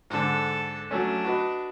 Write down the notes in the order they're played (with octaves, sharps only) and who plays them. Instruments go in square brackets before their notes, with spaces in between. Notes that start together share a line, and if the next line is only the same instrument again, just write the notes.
[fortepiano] G#2 D3 [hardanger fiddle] A4
[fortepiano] F#3 A3 C#4 [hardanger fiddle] D4
[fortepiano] F#4 B4 D#5